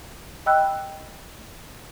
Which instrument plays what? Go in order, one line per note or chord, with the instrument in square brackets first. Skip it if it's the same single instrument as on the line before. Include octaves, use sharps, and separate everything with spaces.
[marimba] D#5 G5 B5 E6 F#6